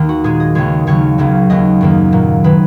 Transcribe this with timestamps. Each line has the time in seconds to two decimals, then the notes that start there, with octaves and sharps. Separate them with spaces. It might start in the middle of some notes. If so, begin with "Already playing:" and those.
Already playing: D#2 D#3 A#3
0.09 F#4
0.24 A#2 G#3 G#4
0.40 D#5
0.55 D#2 C#3 G#3 C#5
0.87 D#2 C#3 F#3 A#3 C#5
1.18 C#2 C#3 F#3 A#3
1.50 D#2 C#3 F#3 D#5
1.81 F#2 D#3 A#3
2.12 A#2 F#3 A#3
2.44 D#3 G#3 B4